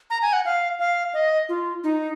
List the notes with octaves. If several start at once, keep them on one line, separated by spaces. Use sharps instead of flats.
A#5
G#5
F#5
F5
F5
D#5
F4
D#4